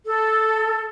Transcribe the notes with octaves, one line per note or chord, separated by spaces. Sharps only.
A4